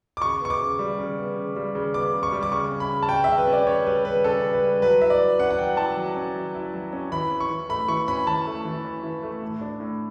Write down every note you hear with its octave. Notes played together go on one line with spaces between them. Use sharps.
D6
C#3 C#6
B3 C#6
D6
C#3
G3
C#3
B3
C#3
G3
C#3
B3 D6
C#3
C#6
G3
D6
C#3 C#6
C#4
B5
C#3
A5
G3 G5
C#3 E5
B4
C#4
D5
C#3 C#5
G3 B4
C#3 B4
C#4 A4
C#3
B4
G3
F#3 B4
E4 E5
D5
F#3
C#4 F#5
F#5
F#3 G5
E4 A5
F#3
C#4
F#3
E4
F#3
C#4
E3 B5
C#4
C#6
E3
A3 B5
E3 C#6
C#4 B5
E3 A5
A3
E3
C#4
E3
A3
A2
D4
A2